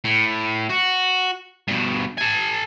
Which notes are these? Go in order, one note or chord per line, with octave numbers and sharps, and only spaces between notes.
A2
F#4
G2 B2
A4 G#5